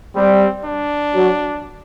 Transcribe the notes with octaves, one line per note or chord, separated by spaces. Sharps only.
G3 C4
D4
F#3